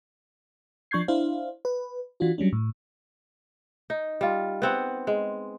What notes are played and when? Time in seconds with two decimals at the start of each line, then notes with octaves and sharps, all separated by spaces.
0.91 F3 D4 C#6 G6 G#6 C7
1.08 D4 E4 C5 F5
1.65 B4
2.20 E3 D4 F4 F#4
2.38 F#3 G3 C#4 D4
2.53 A2
3.90 D#4
4.21 G3 F4
4.62 B3 C4 F#5
5.07 G#3